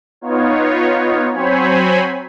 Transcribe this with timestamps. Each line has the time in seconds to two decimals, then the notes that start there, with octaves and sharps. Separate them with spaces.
0.21 B3 D#4 F4 C#5
1.34 F#3 C4 C5 C#5 G#5 B5